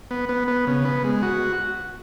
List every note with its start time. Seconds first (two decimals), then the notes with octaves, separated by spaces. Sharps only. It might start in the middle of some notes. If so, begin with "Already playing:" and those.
0.11 B3
0.29 B3
0.48 B3
0.67 C#3
0.85 B3
1.04 G#3
1.22 F#4